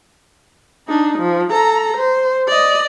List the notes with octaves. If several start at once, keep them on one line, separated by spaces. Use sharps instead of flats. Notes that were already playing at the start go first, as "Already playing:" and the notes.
D4 D#4
F3
A4 A#5
C5
D5 D#5